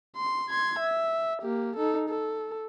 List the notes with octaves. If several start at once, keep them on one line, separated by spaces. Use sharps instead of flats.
C6
C6 G#6
E5
A#3 G4
D#4 A4
A4